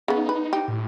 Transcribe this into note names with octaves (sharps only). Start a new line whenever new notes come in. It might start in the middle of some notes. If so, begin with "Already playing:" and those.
C#3 B3 D#4
B4
G4
A2